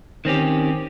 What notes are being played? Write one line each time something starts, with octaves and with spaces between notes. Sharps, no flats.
D#3 C4 C#4 G4